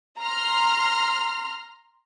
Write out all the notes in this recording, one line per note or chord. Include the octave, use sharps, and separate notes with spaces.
A#5 C6 F6